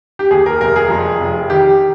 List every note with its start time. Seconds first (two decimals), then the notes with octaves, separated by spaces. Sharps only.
0.19 G4
0.31 D#2 G#4
0.46 A#4
0.61 F1 A#4
0.76 G#4
0.90 F2
1.20 F1
1.50 D#3 G4